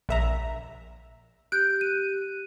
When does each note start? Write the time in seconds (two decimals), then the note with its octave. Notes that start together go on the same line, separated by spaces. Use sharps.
0.09 A#1 E5 A#5
1.52 G4 F#6 G6 D7
1.81 D#7